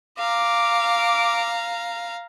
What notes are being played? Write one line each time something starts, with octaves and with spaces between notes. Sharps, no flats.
F5 A#5 D6